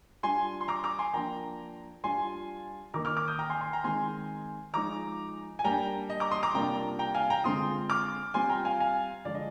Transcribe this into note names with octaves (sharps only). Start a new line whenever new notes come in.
G3 D4 F4 G#5 C6
C6
A#5 D6
A#5 D6
G#5 C6
F3 A#3 D4 G5 A#5
G3 D4 F4 G#5 C6
D#3 A#3 D#4 A#5 D6
D6 F6
D6 F6
D#6 G6
G5 A#5
G#5 C6
G#5 C6
G5 A#5
D#3 G#3 C4 G#5 C6
F3 G#3 D#4 A#5 D6
G#5
G3 A#3 D4 G5 A#5
D#5
A#5 D6
C6 D#6
A#5 D6
C3 G3 A#3 D4 F4 G5 A#5
G5 A#5
F5 G#5
G5 A#5
D3 G#3 C4 F4 C6 D#6
D6 F6
G3 C4 F4 G#5 C6
G5 A#5
F5 G#5
F5 G#5
D3 F3 G#3 D4 D5
D#5